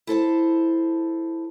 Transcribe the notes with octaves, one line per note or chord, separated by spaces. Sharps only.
E4 A4 C5 A5